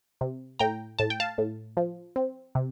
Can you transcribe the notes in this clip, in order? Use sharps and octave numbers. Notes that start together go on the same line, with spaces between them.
C3
A2 G5 A#5
A2 A5
G5
F5 A5
A2
F3
C4
C3